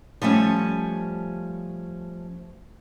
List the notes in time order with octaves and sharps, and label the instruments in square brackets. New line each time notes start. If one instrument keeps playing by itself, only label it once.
[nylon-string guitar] F3 G3 A3 C#4